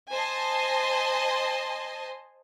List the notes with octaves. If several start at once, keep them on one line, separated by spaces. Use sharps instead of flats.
C5 D#5 G#5 A5 C6